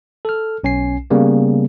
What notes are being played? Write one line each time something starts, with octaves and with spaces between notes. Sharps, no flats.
A4 F6
B1 C#4 G#5 C7
C#3 G3 A#3 B3